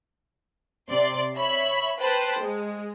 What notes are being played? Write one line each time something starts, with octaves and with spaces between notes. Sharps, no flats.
C3 D5 C6
C#5 E5 B5
B4 C5 G5 A5 B5 C6
G#3